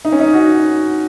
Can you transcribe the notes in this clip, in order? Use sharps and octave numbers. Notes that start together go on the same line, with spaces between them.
D#4
C#4
D#4
F#4